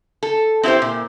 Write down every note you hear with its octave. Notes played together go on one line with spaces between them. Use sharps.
A4
C4 E4 F4 G4 C5
A#2